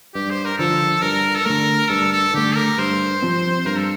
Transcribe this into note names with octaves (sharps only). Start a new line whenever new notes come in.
G2 G4
C5
A#4
D3 F3 A4
G2 A#4
A4
D3 A3 A#4
G2 A4
A4
D3 A3 G4
A#4
G2 C5
F3 C4
G2 A#4
A4